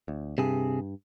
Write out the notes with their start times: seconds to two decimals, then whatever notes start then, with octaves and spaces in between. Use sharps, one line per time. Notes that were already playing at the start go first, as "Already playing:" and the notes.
0.08 D2
0.38 G2 C3 G#4